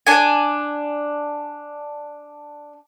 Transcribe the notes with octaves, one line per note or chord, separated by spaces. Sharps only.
D4 G#5